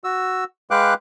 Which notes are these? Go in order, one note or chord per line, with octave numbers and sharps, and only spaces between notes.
F#4 E6
G#3 B4 F5 G5 D6 F#6